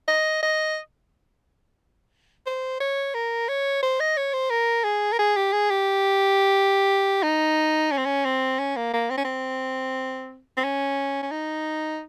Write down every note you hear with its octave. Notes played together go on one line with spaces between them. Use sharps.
D#5
D#5
C5
C#5
A#4
C#5
C5
D#5
C#5
C5
A#4
G#4
A#4
G#4
G4
G#4
G4
D#4
C#4
C4
C#4
C4
C#4
A#3
A#3
C4
C#4
C4
C4
C#4
C#4
D#4